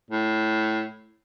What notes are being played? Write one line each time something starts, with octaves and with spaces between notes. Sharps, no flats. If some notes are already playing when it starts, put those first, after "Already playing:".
A2